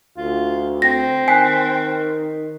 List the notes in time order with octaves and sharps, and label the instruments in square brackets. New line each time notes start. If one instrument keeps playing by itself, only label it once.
[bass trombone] D2 [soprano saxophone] F4
[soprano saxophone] C4 [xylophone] A#6
[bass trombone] D#3 [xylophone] G#5 [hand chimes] F#6 B6 C7